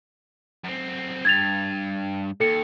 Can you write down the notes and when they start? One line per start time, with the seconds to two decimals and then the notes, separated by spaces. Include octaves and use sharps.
0.64 F#2 C4
1.25 G2 G#6 A6 F7
2.40 D#2 A4 C#7